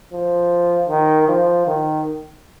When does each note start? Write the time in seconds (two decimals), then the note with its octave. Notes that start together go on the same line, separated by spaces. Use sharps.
0.12 F3
0.89 D#3
1.28 F3
1.67 D#3